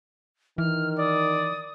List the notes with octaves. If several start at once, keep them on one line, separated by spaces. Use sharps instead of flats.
D#3 E3 F6
D5 D#6